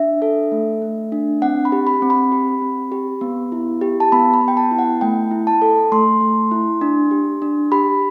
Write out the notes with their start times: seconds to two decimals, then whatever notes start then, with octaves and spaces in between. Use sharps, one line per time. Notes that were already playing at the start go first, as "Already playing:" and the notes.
Already playing: D4 E5
0.22 A4
0.52 A3
0.82 A3
1.12 D4
1.42 C4 F#5
1.65 B5
1.72 G4
1.87 B5
2.02 C4
2.10 B5
2.32 G4
2.62 C4
2.92 G4
3.21 B3
3.52 E4
3.81 G4
4.00 A5
4.12 B3 B5
4.34 B5
4.41 B3
4.48 G5
4.57 A5
4.71 E4
4.78 F#5
5.01 A3 G5
5.31 E4
5.47 A5
5.62 A4
5.92 A3 C6
6.21 A3
6.51 E4
6.81 D4
7.11 G4
7.42 D4
7.72 G4 B5